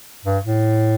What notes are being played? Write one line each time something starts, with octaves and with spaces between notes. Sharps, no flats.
G2
A2